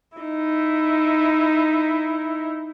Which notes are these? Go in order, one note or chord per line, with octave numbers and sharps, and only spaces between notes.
D#4 E4